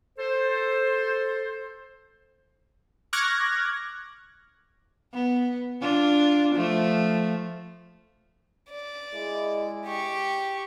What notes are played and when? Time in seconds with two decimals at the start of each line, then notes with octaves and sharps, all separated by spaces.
0.19 A4 C5
3.13 C#6 D6 F6 F#6 G#6 A#6
5.13 B3
5.81 D4 F4
6.56 F3 A3
8.70 D5
9.14 G#3 E4
9.86 G4 C#6